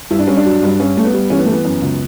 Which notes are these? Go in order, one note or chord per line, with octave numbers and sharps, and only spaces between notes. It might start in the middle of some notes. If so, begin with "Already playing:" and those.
G2 E4
D4
G2 C#4
D4
F#3
G2 D4
G2 C#4
G2 A3
B3
G3
E3 C#4
B3
E3 A3
B3
F#2
C#2